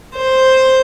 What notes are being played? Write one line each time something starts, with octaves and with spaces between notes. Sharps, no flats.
C5